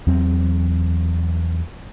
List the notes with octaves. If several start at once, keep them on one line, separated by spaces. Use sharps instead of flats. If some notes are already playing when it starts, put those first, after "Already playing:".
E2 F#3 C4